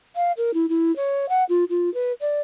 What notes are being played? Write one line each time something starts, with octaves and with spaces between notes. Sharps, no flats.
F5
A#4
E4
E4
C#5
F#5
F4
F4
B4
D5